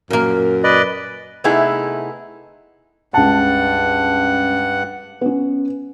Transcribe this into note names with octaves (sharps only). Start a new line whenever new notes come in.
F#2 A#2 A#3
B4 D5 D#5
C3 A3 B3 D#4 E4 G#4
C#2 G2 F#5 A5
B3 C#4